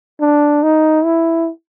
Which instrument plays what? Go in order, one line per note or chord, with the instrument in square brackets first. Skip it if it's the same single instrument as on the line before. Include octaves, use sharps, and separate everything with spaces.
[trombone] D4
D#4
E4